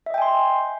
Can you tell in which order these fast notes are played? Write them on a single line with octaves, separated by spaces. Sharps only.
E5 D#5 G5 G#5 C6